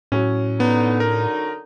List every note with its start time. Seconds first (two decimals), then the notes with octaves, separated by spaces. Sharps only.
0.12 A2 F#3 C#4
0.60 D3 B3 D#4
1.00 A#4